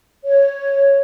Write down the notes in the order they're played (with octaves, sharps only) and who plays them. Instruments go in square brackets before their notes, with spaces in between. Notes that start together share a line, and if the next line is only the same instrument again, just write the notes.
[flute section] C#5